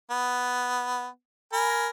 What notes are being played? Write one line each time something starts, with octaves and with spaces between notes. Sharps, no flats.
B3
A#4 G#5 B5